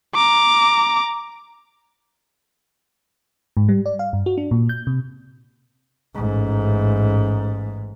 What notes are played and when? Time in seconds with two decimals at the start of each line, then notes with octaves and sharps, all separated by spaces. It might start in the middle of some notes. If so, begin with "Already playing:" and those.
0.15 A#5 D6
3.57 G#2
3.69 G3
3.86 D5
3.99 F5
4.13 G2
4.26 F#4
4.38 D4
4.51 A#2
4.69 G6
4.87 C3
6.15 A1 G#2